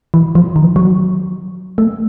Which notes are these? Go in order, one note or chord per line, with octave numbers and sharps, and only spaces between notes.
E3
F3
D#3
F#3
A3